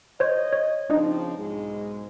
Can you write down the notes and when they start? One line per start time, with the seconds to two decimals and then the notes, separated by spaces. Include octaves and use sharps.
0.20 C5 C#5 D#5
0.53 C#5
0.90 C#3 F3 C4 D4 D#4
1.37 B1 G#2 G#3